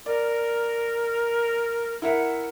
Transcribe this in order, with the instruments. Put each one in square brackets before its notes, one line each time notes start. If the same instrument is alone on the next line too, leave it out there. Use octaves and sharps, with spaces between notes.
[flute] A#4 [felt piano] D5
[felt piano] E4 A#4 E5 [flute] F#5